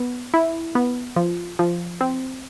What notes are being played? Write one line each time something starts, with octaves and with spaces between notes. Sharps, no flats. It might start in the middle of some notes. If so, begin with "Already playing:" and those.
Already playing: B3
E4
B3
F3
F3
C4